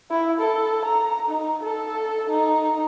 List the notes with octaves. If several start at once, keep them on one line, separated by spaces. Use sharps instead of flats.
E4
A4
A#5
D#4
A4
D#4